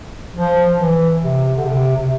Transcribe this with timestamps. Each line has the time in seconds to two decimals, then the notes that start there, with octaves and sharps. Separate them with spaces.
0.35 F3
0.78 E3
1.22 C3
1.57 D3
1.65 C3
1.96 C3